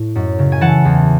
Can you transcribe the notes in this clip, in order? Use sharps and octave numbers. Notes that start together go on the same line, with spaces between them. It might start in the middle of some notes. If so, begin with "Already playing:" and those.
Already playing: A2
F#2
C#3
G#5
E3 F#5 A5
E2